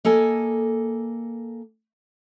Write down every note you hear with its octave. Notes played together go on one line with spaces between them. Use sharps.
A#3 A4 D#5 G#5